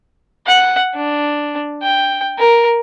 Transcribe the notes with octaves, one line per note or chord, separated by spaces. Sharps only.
F#5
D4
G5
A#4